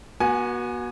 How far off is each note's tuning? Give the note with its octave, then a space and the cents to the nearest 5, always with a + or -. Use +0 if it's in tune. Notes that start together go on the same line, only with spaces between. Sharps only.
B3 -40 F#4 +0 G#5 +0